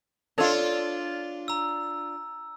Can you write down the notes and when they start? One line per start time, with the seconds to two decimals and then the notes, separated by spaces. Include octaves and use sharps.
0.38 D4 F4 A4 C#5 D#5
1.48 A#5 E6